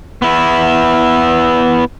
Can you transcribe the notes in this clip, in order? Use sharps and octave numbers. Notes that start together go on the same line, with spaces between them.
B3 E4